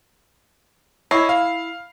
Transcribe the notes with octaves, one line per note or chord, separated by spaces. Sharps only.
E4 C#5 D#5 C7
F5